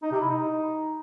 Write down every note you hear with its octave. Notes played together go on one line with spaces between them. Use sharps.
D#4
C3
E4
D#4